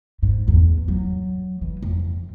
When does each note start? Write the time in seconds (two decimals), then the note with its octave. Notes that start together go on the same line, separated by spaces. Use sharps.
0.23 G#2
0.48 E2
0.88 F#3
1.62 E3
1.82 F2